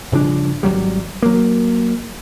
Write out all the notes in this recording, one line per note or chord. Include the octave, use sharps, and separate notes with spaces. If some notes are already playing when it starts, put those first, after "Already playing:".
G2 C#3 F3 D4
G#1 E2 F#3 G3
F#3 A#3